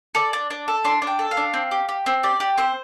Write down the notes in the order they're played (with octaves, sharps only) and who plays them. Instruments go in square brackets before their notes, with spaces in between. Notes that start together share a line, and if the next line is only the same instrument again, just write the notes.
[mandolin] A4 D5
D4
D4
A4
D4 C6
D4
G5
A4
F5
D4
C4
G4
G4
C4
G4 D5
G4
C4 C5